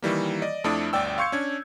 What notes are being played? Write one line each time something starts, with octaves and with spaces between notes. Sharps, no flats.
D#3 E3 G3 A#3
D5 D#5
F2 A3 D4 E4 D5 D#6
G1 D2 D5 G5 E6
F5 C6 C#6 G6 G#6 C#7
C#4 D4 G#6